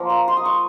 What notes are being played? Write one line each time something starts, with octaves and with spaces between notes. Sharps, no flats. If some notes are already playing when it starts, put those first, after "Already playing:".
Already playing: F3 A#3 F4
A#5
C6
D#6
C#6